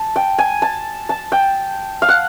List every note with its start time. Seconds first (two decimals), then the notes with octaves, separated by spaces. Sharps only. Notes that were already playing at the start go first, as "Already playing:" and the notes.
Already playing: A5
0.16 G5
0.38 G#5
0.62 A5
1.09 A5
1.32 G5
2.02 F5
2.09 F#5